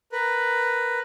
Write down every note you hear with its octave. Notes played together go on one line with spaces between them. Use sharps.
A#4 B4